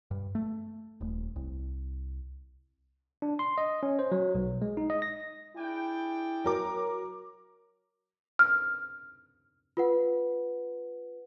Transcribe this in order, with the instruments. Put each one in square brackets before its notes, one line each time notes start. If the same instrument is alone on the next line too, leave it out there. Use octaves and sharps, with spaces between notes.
[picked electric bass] G2
A3
D#1
C2
[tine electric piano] D4
C6
D#5
C#4
C5
F#3
B1
G#3
D#4
D#5
A#6
[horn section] D4 G#4 G5 [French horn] E4
[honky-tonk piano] F#3 A#4 D6
[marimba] F6
[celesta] F4 B4 F#5